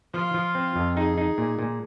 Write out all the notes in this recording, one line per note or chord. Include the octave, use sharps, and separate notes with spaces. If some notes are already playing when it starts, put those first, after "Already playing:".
F3 F4
F3
C4
F2
D#4 G#4
D#4
A#2
A#2